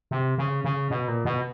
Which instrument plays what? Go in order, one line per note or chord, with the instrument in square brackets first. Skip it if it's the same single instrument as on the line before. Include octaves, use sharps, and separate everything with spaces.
[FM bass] C3
C#3
C#3
B2
A#2
B2